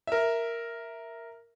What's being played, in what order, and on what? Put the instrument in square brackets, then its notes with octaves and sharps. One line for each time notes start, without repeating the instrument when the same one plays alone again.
[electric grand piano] A#4 E5